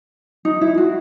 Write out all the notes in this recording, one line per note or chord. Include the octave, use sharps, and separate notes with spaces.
D#4
E4
F#4